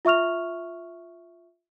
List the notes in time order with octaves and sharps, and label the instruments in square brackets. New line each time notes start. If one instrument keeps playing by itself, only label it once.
[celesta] F4 E5 C#6 F6 F7